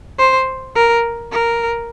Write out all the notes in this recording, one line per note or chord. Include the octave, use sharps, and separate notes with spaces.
C5
A#4
A#4